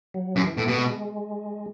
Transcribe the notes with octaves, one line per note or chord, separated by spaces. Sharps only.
F#3
F#2 E3
E3
A2 B3
B2 A3
G#3